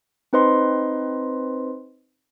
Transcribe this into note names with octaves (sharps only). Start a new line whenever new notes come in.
C4 D#4 B4 C5 D#5 C6